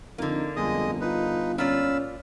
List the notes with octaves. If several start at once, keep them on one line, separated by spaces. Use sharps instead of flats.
F2 D3 A#3 D#4
G1 F2 G#3 D#5 D#6
D#4 F4 B4
A#2 C#4 F4 D5 F5 B5 E6